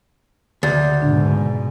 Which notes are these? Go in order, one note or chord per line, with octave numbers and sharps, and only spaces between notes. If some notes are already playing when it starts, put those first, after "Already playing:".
D2 C#3 A6
G#2 B2 D4